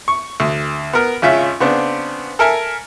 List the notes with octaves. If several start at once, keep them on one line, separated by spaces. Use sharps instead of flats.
C#6
D2
B3 A#4
G#1 C#3 C#4 F4 E5
C#3 B3 C4 D4
A4 A#4 E5 G#5